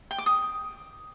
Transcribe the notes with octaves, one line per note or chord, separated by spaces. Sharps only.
G5
D6
D#6